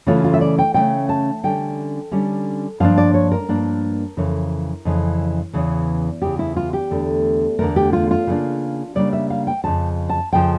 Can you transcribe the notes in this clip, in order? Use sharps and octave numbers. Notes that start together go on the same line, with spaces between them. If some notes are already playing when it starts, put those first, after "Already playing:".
C#3 E3 A3 C#4 F4
F4
E5
D5
G5
C#3 E3 A3 C#4 G5
A5
D3 G3 C#4 G5
D3 G3 C#4
G2 F3 A#3 D4 F5
D5
C#5
A#4
G2 F3 A#3 D4
F2 C#3 E3 A#4
F2 C#3 E3
E2 C#3 E3
E2 C#3 E3 G4
E4
F4
G4
E2 D3 A3
E2 D3 A3 A#4
G4
F4
F4
C#3 G3 A#3 D4
C#3 G3 A#3 D4 D5
E5
F5
G5
F2 C#3 F3 A5
A5
F2 C#3 F3 G5